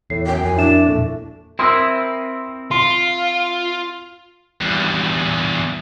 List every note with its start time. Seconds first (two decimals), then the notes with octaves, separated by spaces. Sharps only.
0.10 E2 A2 C7
0.27 F#2 G5
0.44 F2 G#5
0.57 D4 E4 E5 E7
0.88 E1 A#2 A3
1.59 C4 E4 A#4 C6 D#6 E6
2.71 F4 C6
4.61 E2 G2